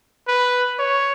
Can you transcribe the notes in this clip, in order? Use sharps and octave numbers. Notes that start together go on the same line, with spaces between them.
B4
C#5